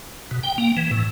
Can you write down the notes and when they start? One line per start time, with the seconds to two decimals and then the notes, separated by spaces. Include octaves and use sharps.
0.31 B2
0.43 G5
0.58 A#3
0.77 E3
0.91 A2